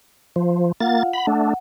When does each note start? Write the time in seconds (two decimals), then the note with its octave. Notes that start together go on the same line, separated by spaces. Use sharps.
0.36 F3
0.80 A#3 F4 F5 F#5 A6
1.13 F#5 B5
1.27 A3 D4